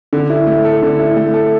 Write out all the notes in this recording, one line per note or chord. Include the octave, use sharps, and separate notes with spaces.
D3
E4
A3
A4
D3
E4
A3
A4